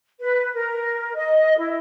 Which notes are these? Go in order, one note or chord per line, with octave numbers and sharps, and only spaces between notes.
B4
A#4
D#5
E4